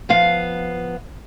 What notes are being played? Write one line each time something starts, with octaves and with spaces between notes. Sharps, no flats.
F3 B3 F5